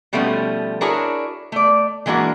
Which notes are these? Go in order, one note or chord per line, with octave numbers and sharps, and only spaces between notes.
B2 F3 G3 A3 B3 C#4
D4 E4 F#4 G#4 A#4 C#5
A3 D5
E3 G#3 A#3 D4 F#4